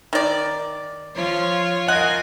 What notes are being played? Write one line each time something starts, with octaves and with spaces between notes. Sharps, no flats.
D#3 D5
F3 F4 C#5
F4 A#4 D#5 F#5 G#5